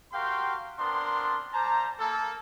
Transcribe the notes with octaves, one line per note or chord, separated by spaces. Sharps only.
F#4 G4 A#4 F5 G5 C6
B3 C4 D4 A#4 C6
G3 C5 A5 A#5
A#3 A4